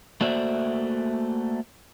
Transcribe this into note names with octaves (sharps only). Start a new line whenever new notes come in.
A3 A#3 F#4 C5 D5 E5